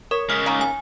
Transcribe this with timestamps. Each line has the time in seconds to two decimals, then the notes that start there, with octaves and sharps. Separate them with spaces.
0.11 A#4 C#5
0.30 C#3 G#3 F6 B6
0.46 D#3 A#3 C#4
0.61 G#5